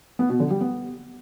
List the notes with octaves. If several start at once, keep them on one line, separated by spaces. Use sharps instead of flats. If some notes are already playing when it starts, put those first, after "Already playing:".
B3
B2
D3
G3
B3